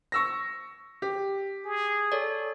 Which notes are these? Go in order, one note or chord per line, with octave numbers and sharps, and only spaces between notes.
C#6 E6 A#6
G4
G#4
A4 C#5 D5